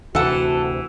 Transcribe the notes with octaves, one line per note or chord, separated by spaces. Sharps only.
D2 C3 E3 F#4 A4 F#5